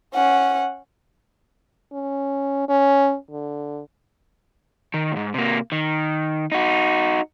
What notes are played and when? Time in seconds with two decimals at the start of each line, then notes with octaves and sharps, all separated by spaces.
0.15 C#4 F#5
1.92 C#4
2.68 C#4
3.31 D3
4.94 D#3
5.12 D2 G#2
5.34 C3 A#3
5.72 D#3
6.52 D#4 F#4